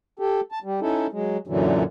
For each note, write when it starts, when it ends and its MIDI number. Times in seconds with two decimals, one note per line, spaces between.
0.19 0.41 67
0.19 0.41 69
0.52 0.59 81
0.63 0.80 55
0.81 1.07 61
0.81 1.07 63
0.81 1.07 64
0.81 1.07 69
1.12 1.37 54
1.12 1.37 56
1.47 1.83 42
1.47 1.83 46
1.47 1.83 50
1.47 1.83 52
1.47 1.83 54